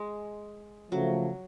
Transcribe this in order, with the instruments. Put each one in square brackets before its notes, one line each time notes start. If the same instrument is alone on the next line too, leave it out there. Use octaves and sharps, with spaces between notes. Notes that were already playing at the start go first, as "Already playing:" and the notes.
Already playing: [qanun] G#3
[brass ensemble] C#3 F3 A3 [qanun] F#3